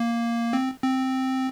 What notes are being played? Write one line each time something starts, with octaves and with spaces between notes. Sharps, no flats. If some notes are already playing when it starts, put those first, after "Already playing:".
Already playing: A#3
C4
C4